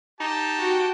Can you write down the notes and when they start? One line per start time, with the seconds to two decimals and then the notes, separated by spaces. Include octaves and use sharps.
0.20 D#4 G4 A5
0.59 F#4 G5